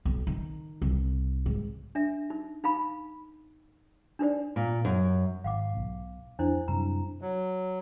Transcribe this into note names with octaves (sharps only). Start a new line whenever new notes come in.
B1
D#3
C2
G#2
D4 E5
D#4
D#4 F5 B5
D4 D#4 C5 D5
A#2
F#2
G#1 F5 F#5 D6
B1
F2 D4 E4 C5
F#2 C3 G3 A#5
F#3